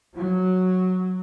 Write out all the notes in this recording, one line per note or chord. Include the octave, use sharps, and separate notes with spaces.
F#3